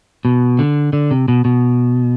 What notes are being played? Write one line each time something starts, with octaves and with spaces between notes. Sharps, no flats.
B2
D3
D3
C3
B2
B2